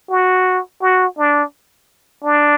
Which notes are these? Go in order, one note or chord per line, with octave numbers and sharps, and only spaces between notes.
F#4
F#4
D4
D4